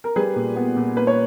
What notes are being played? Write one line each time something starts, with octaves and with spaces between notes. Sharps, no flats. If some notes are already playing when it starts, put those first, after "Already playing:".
A#4
G3 G#4 B4
A#2
B3
A#2
A#3 B4
C#5